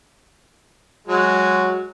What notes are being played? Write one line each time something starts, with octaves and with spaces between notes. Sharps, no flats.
F#3 G#3